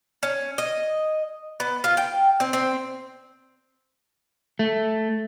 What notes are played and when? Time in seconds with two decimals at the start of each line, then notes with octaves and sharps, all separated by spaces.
0.23 C#4
0.58 D#5
1.60 B3
1.84 F4
1.97 G5
2.40 C4
2.53 C4
4.59 A3